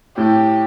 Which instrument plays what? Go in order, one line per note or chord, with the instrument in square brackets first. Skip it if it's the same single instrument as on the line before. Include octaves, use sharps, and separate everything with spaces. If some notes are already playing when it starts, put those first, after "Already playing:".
[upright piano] A2 [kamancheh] G4